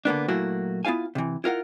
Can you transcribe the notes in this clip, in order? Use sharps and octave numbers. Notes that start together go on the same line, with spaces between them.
D3 A#3 B3 D4
A#2 F#3 A3 A#3 E4 F#4
B3 E4 F4 F5 G#5
C3 E3
E4 F4 A#4 F#5